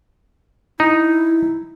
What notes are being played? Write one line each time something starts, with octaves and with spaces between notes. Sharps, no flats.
D#4 E4